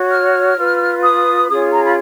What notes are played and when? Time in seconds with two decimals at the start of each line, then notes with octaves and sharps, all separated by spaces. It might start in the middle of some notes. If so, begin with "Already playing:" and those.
Already playing: F#4 C#5
0.08 F6
0.55 F4 B4
1.02 D#6
1.48 C#4 F4 G#4 C#5 D#6
1.72 A#5
1.83 B5